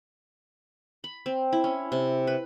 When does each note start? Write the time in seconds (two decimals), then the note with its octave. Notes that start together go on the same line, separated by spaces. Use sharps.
1.04 B5
1.26 C4
1.53 E4
1.64 C#4
1.92 C3
2.27 B4